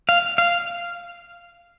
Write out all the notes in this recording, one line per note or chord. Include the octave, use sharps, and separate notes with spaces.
F5
F5